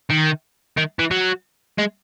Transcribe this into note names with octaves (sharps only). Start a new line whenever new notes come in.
D#3
D#3
E3
F#3
G#3